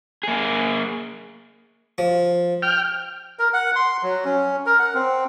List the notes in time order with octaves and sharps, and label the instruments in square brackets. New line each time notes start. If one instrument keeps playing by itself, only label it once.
[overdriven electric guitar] A#3 G#4
[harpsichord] F3
[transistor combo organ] G5 F6
[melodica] A#4
F#5
C6
F#3
C#4
A#4
F#5
C4